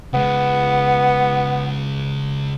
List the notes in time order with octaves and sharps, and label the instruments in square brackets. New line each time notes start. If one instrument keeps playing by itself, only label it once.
[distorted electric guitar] C#3 G#3 [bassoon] B3